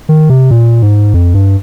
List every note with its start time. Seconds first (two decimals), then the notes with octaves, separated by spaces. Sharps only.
0.09 D#3
0.30 C3
0.51 A#2
0.82 G#2
1.14 F2
1.34 G2